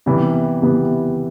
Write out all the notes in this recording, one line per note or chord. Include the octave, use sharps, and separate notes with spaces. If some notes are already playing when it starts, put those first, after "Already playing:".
C3 E3 G3 B3
C3 E3 G3 B3